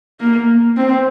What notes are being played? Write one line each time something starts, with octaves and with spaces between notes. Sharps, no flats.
A#3
C4